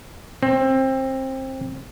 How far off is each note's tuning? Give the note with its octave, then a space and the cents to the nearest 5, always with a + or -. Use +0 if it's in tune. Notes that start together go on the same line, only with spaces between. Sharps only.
C4 +20